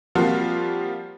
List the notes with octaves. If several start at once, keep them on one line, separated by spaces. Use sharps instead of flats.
F3 G3 A#3 C4 F4 F#4